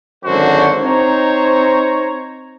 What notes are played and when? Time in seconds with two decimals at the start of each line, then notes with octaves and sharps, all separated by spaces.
0.25 G#1 F#2 D3 F#4 C5
0.80 C4 D#4 C5 C#5 A#5